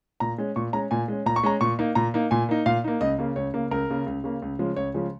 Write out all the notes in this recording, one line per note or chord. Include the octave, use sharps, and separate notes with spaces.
A#2 A#5
G#3 C#4
A#2 C#6
G#3 C#4 A#5
A#2 G#5
G#3 C#4
A#2 A#5
C#6
G#3 C#4 A#5
A#2 C#6
A#3 D#4
A#2 A#5
A#3 D#4
A#2 G#5
A#3 D#4
A#2 F5
A#3 D#4
C#2 D#5
C#3 A#3
C#2 C#5
C#3 A#3
C#2 A#4
C#3 A#3
C#2
C#3 A#3
C#2
C#3 F3 G#3 C#4
C#2 C#5
C#3 F3 G#3 C#4